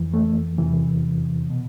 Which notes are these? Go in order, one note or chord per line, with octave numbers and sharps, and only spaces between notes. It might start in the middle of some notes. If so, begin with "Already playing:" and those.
Already playing: F2 E3
A3
E2 C3 E3
B2